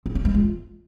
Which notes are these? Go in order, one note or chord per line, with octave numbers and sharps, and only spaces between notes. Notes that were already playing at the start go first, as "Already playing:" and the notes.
C4
C#4
G#3
F4